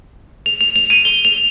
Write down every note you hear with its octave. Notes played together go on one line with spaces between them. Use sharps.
F7
F7
F7
D#7
G7
F7